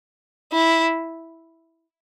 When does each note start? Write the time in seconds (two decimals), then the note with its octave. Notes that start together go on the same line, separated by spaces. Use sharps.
0.52 E4